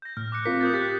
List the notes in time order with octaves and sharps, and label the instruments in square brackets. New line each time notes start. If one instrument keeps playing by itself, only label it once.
[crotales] G6 A#6
[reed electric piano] A2 [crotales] F6
[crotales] D6 F#6 C#7
[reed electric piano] C4 F4 A#4 [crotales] B6
[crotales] D#6 G6 A6
[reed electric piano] G4 [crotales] F#6 A6 B6